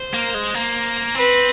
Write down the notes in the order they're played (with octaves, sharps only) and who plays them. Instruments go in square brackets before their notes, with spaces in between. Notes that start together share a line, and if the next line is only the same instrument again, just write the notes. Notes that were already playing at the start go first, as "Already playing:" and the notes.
Already playing: [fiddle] C5
[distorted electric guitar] A#3
G#3
A#3
[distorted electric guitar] C4 [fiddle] B4